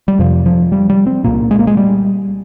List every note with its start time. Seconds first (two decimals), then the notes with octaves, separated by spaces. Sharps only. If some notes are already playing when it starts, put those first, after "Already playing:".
0.08 G3
0.19 F2 C3 F3
0.46 F3
0.72 G3
0.90 G3
1.07 C4
1.24 C2 A#2 A#3
1.51 G#3
1.59 A#3
1.67 G#3
1.77 G3